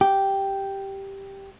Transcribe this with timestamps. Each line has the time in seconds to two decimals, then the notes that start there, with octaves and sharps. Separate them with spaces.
0.01 G4